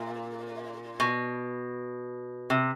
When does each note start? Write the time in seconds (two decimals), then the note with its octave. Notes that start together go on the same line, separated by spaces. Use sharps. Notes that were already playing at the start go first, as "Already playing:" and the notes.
Already playing: A#2
1.00 B2
2.50 C3